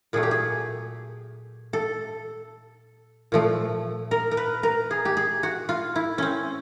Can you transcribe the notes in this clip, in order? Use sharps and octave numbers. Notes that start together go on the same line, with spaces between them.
A#2 F#3 A3 G#4
G4
G#4
A4
A#2 F3 A3
A#4
A#4
B4
A#4
G#4
G4
G#4
F#4
F4
E4
C4 C#4